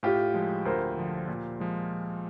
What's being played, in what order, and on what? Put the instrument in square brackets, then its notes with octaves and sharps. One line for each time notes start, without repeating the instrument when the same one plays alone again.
[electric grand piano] A2 [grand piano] F4 G4
[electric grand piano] F3 G#3
[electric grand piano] D2 [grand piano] A#4 C5
[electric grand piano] D3 F3
A#2
F3 G#3